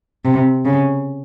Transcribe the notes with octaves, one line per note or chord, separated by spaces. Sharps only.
C3
C#3